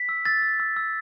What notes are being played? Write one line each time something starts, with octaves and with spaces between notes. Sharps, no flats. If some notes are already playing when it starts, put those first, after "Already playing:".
Already playing: B6
E6
E6 A6
E6
E6
E6